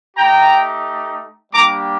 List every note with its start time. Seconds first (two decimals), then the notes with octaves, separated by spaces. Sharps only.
0.17 A3 D#4 G4 G5 A#5
1.52 G3 A#3 D4 G4 A#5 D6